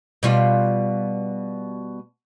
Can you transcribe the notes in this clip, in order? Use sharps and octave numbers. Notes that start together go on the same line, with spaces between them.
B2 G3 F4